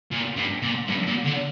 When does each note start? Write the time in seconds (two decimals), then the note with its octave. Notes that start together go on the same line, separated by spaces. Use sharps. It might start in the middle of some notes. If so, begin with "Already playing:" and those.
0.11 A#2
0.36 G2
0.62 A#2
0.87 G2
1.06 A#2
1.25 D3